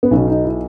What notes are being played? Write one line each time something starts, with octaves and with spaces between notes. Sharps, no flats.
B3
B1 C#4
B2
D#4
E4